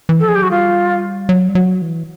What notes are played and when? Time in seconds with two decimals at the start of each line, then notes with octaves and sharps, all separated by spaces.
0.09 E3
0.20 A4
0.23 F3 G#4
0.35 F#3 G4
0.42 F#4
0.51 G3 F4
1.29 F#3
1.49 G3
1.55 F#3
1.82 E3